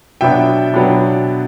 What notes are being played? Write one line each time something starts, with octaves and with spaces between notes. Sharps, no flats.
B2 F#3 B3 D4 E5 G5
B2 F#3 B3 D4